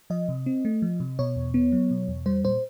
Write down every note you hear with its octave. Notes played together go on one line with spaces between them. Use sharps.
F3 D#5
C3
C4
A3
F3
C3
B2 C#5
E2
B3
F#3
B2
E2
G3 C5
A#2 C5